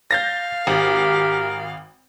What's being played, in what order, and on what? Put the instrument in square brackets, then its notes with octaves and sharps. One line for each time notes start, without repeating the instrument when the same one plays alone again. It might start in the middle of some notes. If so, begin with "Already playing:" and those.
[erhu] F5 [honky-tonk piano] G6 A6 A#6
[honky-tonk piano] G#1 [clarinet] G4 [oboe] A#4